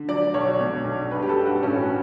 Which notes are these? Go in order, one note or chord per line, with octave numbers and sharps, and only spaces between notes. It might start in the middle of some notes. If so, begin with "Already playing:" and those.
Already playing: D3
F#3 D5
B1 C#5
B2
B1
G2 B4
G4
A4
G2
F#4
A1 C#4